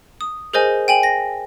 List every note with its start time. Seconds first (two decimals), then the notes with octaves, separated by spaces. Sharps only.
0.21 D#6
0.53 G#4 A#4 C5 D#5 G#5
0.88 G5 G#5 F#7
1.03 A#6